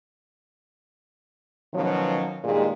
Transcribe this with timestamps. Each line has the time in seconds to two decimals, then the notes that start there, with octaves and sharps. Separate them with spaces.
1.73 B2 D#3 F3 F#3 C#4 C#5
2.44 G2 A#2 D#3 G#3